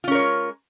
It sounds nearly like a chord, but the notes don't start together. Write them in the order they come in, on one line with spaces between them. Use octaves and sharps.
F4 C#4 A#4 C#5 G#3